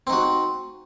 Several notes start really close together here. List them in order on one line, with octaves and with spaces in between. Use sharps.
C4 D#4 F#4